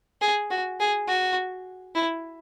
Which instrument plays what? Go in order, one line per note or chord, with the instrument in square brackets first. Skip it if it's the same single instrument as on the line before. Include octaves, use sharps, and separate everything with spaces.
[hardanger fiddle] G#4
F#4
G#4
F#4
E4